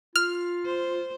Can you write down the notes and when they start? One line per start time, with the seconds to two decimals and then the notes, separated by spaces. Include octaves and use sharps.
0.16 F4 F6
0.65 C5